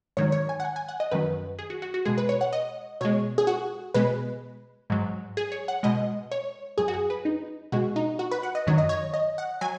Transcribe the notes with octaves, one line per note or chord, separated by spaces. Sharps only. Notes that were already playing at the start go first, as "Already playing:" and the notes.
G#2 D#3 F#3 C#5
C#5
G#5
F#5
G#5
G#5
F#5
D#5
F#2 D#3 F#3 B4
G#4
F#4
F#4
F#4
B2 G#3 G#4
B4
C#5
F#5
D#5
B2 G#3 C#5
G#4
F#4
B2 G#3 B4
G#2 F#3
G#4
C#5
F#5
B2 G#3 D#5
C#5
F#2 F#3 G#4
F#4
G#4
B4
D#4
B2 G#3 F#4
D#4
F#4
B4
F#5
D#5
F#2 D#3 F#3 C#5
D#5
C#5
D#5
F#5
F#3 G#5